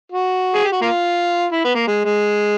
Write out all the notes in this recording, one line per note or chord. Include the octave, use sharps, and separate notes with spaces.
F#4
G#4
G4
F#4
A#3 F4
E4
B3
A#3
G#3
G#3